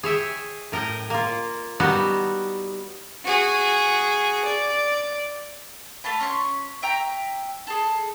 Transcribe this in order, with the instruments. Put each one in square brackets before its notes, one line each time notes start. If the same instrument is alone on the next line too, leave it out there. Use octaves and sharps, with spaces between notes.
[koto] G#4 C#5 E5 G5
A2 A#4 D#5 G5
A#3 F4
G3 B3 D#4 F#4
[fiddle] F#4 G#4
D5
[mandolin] A3 F5 A5 B5
C#4 C6 C#6
E5 G5 A#5
G#4 A4